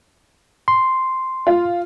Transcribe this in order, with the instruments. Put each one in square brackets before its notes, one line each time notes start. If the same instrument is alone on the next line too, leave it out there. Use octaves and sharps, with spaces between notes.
[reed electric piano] C6
[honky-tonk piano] F4